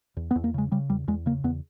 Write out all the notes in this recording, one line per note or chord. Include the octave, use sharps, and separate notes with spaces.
E2
B3
E2
A#3
C#3 G#3
C#3 G3
E2 G3
E2 G#3
C#3 A#3
E2 B3